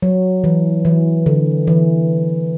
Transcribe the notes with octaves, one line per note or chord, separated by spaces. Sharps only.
F#3
E3
E3
D3
E3